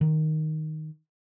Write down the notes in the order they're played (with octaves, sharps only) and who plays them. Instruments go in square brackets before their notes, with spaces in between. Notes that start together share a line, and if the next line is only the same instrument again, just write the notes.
[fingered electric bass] D#3